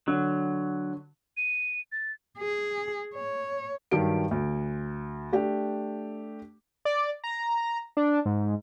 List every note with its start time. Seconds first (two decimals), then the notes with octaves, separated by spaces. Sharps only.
0.08 D3 F#3
1.37 D#7
1.92 A6
2.38 G#4
3.14 C#5
3.91 G2 D#3 F#3 G4 D7
4.31 D2
5.32 A3 D4 G4
6.85 D5
7.24 A#5
7.97 D4
8.26 G#2